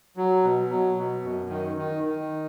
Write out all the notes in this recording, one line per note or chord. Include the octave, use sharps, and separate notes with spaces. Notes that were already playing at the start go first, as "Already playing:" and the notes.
F#3
B2
F#3
B2
F#2
D#3
D#3
D#3